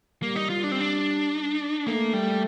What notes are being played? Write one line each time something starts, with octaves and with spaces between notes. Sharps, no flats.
G3 A#3
D#4
F4
D4
C4
D4
A3 A#3
G3